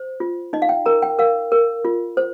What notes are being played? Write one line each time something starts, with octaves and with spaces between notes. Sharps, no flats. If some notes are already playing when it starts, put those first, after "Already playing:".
Already playing: C5
F4
D#4 D#5
F5
G5
A#4 A#5
G5
A#4 F5
A#4
F4
C5